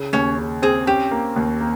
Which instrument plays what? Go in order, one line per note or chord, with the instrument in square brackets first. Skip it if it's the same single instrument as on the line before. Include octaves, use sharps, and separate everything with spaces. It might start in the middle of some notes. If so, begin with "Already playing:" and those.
Already playing: [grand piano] C#3
[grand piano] D#2 [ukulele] C#4 C#5
[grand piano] C#3
[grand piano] C4 [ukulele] G#4
[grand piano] C#4 [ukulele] G4
[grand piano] A#3
D#2
A#3